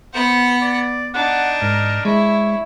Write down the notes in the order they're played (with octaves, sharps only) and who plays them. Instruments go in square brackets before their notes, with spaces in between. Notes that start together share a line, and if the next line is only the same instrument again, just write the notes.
[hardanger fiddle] B3 F#5 [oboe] C5
[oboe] D5
[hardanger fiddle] D4 D#4 [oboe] F#5
[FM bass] G#2 [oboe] A#4
[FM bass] G#3 [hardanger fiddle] E4 [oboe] C#5